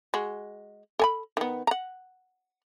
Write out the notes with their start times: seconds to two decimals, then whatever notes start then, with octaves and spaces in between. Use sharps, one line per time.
0.14 G#3 F#4
0.99 A4 G#5 B5
1.37 D#3 B3
1.67 F#5 A#5